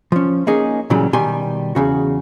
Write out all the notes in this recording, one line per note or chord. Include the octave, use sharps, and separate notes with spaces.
F3 C#4
A#3 C#4 D#4 G#4
A#2 C#3 E3 F#3 G3
B2 D#3 G3 G4 G#5 C6
E2 G2 C#3 F#4